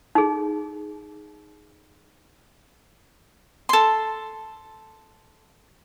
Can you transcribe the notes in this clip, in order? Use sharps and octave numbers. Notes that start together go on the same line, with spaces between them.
D#4 G#4
A4 C6